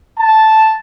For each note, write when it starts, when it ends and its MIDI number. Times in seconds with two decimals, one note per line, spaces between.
0.19 0.78 81